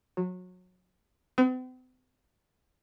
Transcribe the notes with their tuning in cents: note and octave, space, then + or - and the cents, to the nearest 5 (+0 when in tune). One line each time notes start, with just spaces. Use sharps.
F#3 -25
C4 -45